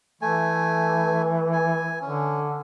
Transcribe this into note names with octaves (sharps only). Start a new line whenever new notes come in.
E3 A3 G#5
G#5
D3 C#4